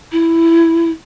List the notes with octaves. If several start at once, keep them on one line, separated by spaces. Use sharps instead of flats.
E4